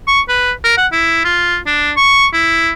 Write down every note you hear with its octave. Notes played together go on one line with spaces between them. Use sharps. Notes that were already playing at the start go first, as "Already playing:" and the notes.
C#6
B4
A#4
F#5
E4
F4
D4
C#6
E4